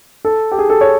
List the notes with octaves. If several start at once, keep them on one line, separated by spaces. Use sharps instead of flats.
A4
G4
G#4
A4
C#5